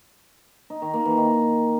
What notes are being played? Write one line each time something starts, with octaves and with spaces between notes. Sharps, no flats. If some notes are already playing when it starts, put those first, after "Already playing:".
D#4
D#3
A#3
E3
D#3